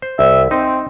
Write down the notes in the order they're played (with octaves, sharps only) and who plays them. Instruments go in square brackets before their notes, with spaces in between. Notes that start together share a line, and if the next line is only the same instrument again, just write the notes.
[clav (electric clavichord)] C5
[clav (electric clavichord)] C2 [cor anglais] E5
[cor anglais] C4 [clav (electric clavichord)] D#4